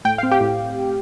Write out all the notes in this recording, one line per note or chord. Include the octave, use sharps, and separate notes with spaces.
A2 G5
C4 F5
G4 G5
A2